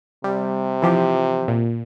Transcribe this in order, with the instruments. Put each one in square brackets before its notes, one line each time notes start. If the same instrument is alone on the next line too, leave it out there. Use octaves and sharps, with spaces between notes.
[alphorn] C3 [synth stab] G3
[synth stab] E3 F3 G4
A#2